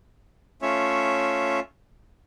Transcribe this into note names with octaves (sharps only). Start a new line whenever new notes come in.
A3 C#4 F4 C#5 E5